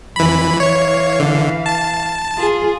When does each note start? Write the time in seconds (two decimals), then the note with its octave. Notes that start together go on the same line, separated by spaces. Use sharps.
0.16 F2 E3 B5
0.60 E3 C#5 F5
1.19 D3
1.66 A5
2.37 F4 G#4